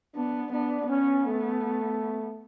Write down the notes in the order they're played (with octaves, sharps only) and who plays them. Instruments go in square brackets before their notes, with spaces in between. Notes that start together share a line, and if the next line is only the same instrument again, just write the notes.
[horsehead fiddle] B3 [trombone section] D4
[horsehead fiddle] B3 [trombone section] D4
[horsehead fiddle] B3 [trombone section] C#4
[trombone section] A3